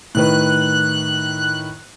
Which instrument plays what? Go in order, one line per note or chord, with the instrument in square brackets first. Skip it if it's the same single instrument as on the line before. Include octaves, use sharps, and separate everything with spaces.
[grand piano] A2 D#3 B4 [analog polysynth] F#6